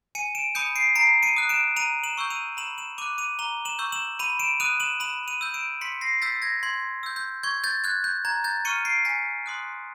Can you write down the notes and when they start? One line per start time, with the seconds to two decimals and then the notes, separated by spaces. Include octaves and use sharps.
0.15 G#5 C#7 D#7
0.35 D7 E7
0.55 B5 D#6 G6 C#7 D#7
0.76 C7 D7
0.95 A#5 C7 D7
1.23 C#7 D#7
1.36 D#6 F#6
1.49 D7 E7
1.76 A#5 D#7 F7
2.03 E7 F#7
2.17 C#6 E6 G6
2.30 D#7 F7
2.57 B5 E7 F#7
2.78 E7 F#7
2.98 D6 D#7 F7
3.02 F#6
3.18 D#7 F7
3.39 A#5 F7 G7
3.65 E7 F#7
3.79 C#6 E6 G6
3.92 E7 F#7
4.19 B5 D#7 F7
4.39 D7 E7
4.60 D#6 F#6 D#7 F7
4.80 E7 F#7
5.00 B5 E7 F#7
5.28 D#7 F7
5.41 E6 G6
5.54 D7 E7
5.81 C6 B6 C#7
6.01 A#6 C7
6.22 E6 G6 A6 B6
6.42 G#6 A#6
6.63 C6 G#6
7.03 E6 G6
7.16 G6
7.43 C#6 G#6
7.64 G6 A6
7.84 F#6 G#6
8.04 G6
8.25 A#5 G#6
8.44 G6 A6
8.65 C#6 F6 C#7 D#7
8.85 C7 D7
9.05 G#5 B6 C#7
9.46 C6 D#6 F#6